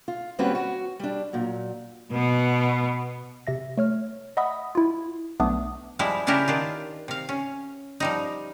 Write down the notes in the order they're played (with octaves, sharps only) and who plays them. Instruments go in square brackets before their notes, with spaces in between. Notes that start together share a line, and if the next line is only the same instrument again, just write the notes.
[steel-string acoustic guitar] F4
D#2 G3 C4 C#4 F#4 B4
F#4
G3 D4
A#2 F#3
[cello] B2 B3
[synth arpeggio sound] C3 E5 A#6
A3 C#5 F6
D#5 E5 F#5 B5 D#6 E6
E4 F4
B1 A3 B3 D4 D6 D#6
[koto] F3 G3 G#3 E4
C#3 C#4 D4 E4 G4 A#4
D#3 D4 F4
C3 F5
C#4
F3 G3 D#4